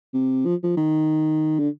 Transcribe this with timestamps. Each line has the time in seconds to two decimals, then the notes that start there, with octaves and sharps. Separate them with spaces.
0.14 C3
0.46 F3
0.63 F3
0.77 D#3
1.59 D3